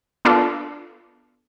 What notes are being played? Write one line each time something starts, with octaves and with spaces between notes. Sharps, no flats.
B3 D4 F4 A4